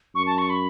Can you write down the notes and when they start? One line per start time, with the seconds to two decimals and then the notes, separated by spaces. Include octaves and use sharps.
0.15 F#2 C#6
0.26 A5
0.38 C#6
0.50 B5